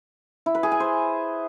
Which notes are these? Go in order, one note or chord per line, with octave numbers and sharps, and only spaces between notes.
E4
B4
G#4
G#5
C5